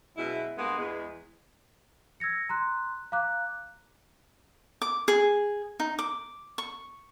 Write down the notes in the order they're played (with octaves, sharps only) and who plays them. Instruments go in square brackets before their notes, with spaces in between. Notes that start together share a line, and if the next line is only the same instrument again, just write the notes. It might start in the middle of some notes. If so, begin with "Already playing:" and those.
[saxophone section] F#2 B2 G#3 E4
G2 G#3 A#3 B3
E2 G#3
[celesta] E6 G#6 A#6 C#7
A#5 C6 F#6
F5 A#5 D6 F#6
[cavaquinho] D6
G#4
D#4
D6
C#6